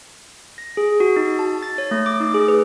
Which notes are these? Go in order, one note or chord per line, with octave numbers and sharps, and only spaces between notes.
A#6
G#4
F#4
D#4
A5
A6
C#5
A3
D6
D#4
G#4
B4